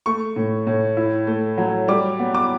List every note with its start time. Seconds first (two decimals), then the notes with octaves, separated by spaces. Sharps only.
0.06 A3 C#6
0.36 A2
0.67 A2
0.97 E4
1.27 A3
1.58 F#3
1.88 G3 D6
2.19 B3
2.35 D6